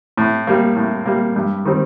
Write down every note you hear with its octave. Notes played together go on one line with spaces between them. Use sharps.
A2
G3 A#3
A2
G3 A#3
G2
D#3 G3 C4